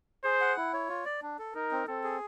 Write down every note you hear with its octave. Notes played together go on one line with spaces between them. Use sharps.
G#4 C5
F#5
E4
C#5
F4
D5
D4
A4
D#4 A#4
C4
C4 A4
G#4